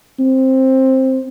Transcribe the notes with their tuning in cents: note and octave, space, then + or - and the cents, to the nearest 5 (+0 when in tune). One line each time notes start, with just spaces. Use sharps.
C4 +10